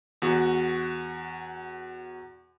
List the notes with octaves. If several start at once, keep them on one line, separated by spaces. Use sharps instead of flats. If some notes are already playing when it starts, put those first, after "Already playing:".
E2 F#4